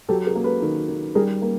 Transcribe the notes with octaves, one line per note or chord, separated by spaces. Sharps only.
F#3 G4 A4
G#4 A#4
A#3
A4 B4
D#3
D#3
G3 G#4 A#4
A#3